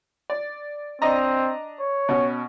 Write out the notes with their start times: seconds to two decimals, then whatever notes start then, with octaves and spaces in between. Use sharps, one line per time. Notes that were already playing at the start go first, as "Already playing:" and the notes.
0.30 D5
1.02 C4 D4 D#5 A#5
1.80 C#5
2.09 B2 C#4